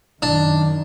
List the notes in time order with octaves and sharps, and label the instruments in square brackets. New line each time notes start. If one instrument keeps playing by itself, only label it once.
[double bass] F#2 D#3 [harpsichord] D4